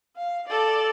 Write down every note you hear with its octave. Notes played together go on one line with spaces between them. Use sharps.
F5
A4 D5